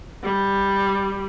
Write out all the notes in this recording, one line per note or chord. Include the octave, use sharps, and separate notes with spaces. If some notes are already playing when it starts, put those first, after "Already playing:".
G3